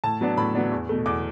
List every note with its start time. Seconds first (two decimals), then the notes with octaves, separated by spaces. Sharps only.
0.04 A2 A5
0.21 F#3 B3 D4
0.37 A2 B5
0.55 F#3 B3 D4
0.71 E2
0.89 B2 A3
1.06 E2 D6